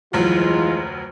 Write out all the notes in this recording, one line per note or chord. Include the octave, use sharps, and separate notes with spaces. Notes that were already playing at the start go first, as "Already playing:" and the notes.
F1 D2 E3 F#3 G#3 F4